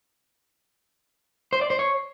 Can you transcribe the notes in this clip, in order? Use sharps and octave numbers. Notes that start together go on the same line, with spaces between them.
C5
D5
C5
C#5